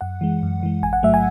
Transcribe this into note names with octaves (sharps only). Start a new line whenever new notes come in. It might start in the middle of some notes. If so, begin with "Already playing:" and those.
F#2 F#5
E3 G#3
F#2
E3 G#3
A1 G#5
F#5
G#2 F#3 A3 E5
G#5